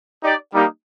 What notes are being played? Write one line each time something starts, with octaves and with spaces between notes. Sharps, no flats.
D#4 G4 D5
G3 A#3 D#4 G4